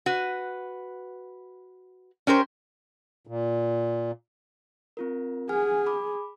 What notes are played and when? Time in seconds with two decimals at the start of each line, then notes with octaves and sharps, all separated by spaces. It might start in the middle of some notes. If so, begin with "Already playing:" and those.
0.06 F#4 B4
2.27 C#4 G4 A#4 C5
3.27 A#2
4.97 C4 F4 A#4
5.49 G#4 F#5 G#5 F6
5.86 B5 D6